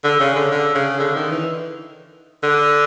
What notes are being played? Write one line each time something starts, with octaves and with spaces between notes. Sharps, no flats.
D3
C#3
D3
D3
C#3
D3
D#3
E3
D3